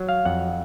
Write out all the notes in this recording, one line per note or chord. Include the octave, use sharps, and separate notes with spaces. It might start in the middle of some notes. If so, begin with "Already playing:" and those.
Already playing: F#3
F5
F2 F#5